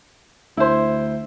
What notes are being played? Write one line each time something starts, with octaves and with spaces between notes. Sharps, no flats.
D2 E4 C5